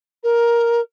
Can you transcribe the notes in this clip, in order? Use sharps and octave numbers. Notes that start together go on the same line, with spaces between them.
A#4